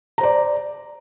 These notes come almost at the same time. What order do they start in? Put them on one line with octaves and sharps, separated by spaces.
A#5 C5 D5